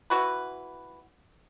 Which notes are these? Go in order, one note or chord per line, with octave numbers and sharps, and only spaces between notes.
E3 F#4 B4